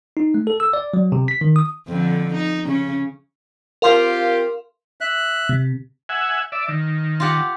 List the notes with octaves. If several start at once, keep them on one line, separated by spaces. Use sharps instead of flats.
D#4
A3
A4
E6
D5
F#3
C3
B6
D#3
D#6
F2 D3
D#4
C#3 C#4
C4 F4 G4 A#4 F5 C6
E5 F#6
C3
E5 F#5 G#5
D5 E5
D#3
F4 G4 F#5